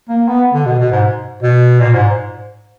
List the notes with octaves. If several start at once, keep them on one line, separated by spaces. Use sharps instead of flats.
A#3
B3
D3
B2
B2
G#2
B2
A#2
G#2